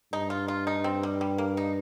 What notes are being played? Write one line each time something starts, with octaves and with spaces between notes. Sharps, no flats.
G2 D#4
F4
F4
D#4
C4
G3
G3
A#3
D#4